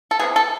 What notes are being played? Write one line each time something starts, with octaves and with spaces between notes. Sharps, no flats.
A4
C3 E3 G#3 B3 G#4
A4